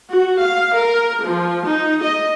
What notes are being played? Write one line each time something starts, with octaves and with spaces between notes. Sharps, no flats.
F#4
F5
A#4
F3
D#4
D#5